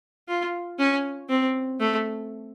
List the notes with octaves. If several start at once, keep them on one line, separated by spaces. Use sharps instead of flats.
F4
C#4
C4
A3